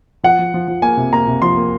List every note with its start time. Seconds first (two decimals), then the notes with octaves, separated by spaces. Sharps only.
0.23 F3 F#5
0.39 F3
0.54 F3
0.68 F3
0.82 A#3 G#5
0.97 C3
1.12 A#3 A#5
1.28 C3
1.42 F3 C6
1.57 A#3